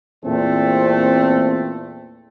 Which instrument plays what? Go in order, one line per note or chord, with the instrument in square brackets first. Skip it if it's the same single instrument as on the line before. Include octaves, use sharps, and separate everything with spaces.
[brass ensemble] E2 A#2 A3 C4